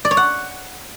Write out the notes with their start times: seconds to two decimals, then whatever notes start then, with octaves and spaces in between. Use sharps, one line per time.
0.05 D5
0.11 C#5
0.17 F#5